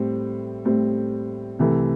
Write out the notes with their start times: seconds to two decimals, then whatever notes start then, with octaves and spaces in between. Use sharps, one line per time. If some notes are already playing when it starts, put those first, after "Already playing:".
Already playing: A2 G3 C4
0.65 A2 G3 C4
1.59 C2 C3 E3 A3